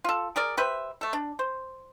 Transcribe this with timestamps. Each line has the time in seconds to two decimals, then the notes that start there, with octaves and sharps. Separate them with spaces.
0.04 F4 A4
0.36 G#4 A#4 D5
0.57 G4 B4 C5 E5
1.01 A3 A4
1.13 D4
1.39 C5